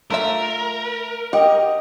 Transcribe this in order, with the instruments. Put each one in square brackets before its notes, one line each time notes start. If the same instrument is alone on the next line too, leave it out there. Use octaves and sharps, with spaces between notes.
[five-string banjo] A3 F4 E5 [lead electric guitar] A#4
[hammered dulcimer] G4 [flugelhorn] D#5 [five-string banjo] F#5